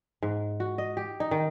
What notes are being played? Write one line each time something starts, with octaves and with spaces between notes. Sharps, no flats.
G#2
F#4
D#5
G4
D#4
D#3